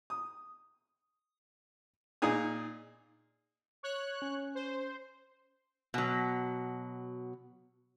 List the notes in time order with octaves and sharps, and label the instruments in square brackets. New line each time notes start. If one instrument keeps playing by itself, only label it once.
[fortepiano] D#6
A#2 D#4 G#4 D#6
[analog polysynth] C#5 F#6
[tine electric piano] C#4
[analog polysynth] C5
[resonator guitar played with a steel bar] B2 F#3